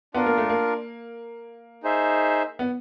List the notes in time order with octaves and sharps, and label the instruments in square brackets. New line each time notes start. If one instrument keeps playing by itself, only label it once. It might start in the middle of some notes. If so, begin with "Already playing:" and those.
[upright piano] B3 [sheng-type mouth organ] D4 F4 A#4
[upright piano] A#3
A3
A#3
[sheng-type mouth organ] D#4 G#4 C5 E5
[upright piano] B3